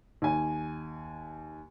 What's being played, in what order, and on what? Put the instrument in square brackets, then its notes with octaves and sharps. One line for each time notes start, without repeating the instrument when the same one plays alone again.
[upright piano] D#2 G#5